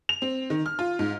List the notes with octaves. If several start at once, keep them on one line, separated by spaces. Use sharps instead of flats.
F7
C4
D#3
F6
F4
G#2